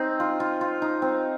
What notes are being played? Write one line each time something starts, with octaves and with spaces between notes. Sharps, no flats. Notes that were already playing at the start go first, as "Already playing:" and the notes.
Already playing: C4 D#4
F4
F4
F4
D#4
C4